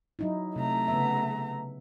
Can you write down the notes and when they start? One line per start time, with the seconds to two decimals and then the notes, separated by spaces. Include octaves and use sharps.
0.19 F#3 D#4 E4
0.56 C3 A3 A#5
0.88 C#3 B3 E5